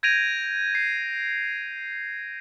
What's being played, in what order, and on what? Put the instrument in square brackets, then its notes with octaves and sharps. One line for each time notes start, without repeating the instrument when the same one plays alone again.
[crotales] G6 G#6 A#6 D7 D#7 F7
C7